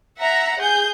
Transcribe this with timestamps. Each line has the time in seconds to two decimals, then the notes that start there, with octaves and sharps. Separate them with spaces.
0.19 E5 F#5 A#5
0.58 G#4 G6